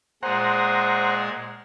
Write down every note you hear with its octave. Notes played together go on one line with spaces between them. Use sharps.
A#2 G#3 G#4 C5 F#5 A#5